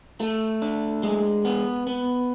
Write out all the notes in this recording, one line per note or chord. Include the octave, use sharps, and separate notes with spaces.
A3
D4
G#3
B3
B3